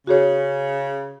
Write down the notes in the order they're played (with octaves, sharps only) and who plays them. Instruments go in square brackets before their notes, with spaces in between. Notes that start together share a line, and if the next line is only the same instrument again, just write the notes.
[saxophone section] C#3 [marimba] F#4 G#4 C#5